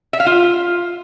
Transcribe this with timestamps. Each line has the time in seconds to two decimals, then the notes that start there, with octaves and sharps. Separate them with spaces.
0.13 E5
0.20 F5
0.26 F4